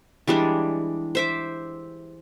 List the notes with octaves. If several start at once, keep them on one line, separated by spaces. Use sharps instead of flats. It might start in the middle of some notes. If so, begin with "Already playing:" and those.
E3 G3 G#3 D4
C5 E5 D6